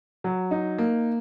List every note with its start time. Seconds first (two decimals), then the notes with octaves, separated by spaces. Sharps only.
0.24 F#3
0.51 D#4
0.78 A#3